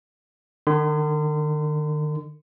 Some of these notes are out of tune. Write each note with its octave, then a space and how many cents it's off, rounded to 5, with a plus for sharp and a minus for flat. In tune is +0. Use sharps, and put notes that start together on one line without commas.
D#3 -45 C6 -35